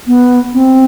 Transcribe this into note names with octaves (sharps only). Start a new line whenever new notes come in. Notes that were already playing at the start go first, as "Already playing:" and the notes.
B3
C4